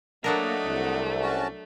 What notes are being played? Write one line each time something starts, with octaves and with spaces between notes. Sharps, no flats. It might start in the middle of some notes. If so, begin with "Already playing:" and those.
F#3 A3 A#3 D4 A#4 D#5 F#5
C2
C#4 F#4 A5